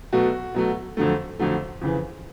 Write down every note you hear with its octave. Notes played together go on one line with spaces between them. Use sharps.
B2 F#3 A3 F#4
B2 F#3 A3
F2 D3 F#3 A3
F2 D3 F#3 A3
F2 C#3 E3